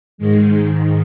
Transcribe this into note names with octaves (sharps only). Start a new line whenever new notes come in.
G#2 D#3 G#3